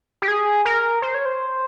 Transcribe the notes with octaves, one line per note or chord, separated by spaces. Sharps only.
G4
G#4
A#4
C5
C#5
C5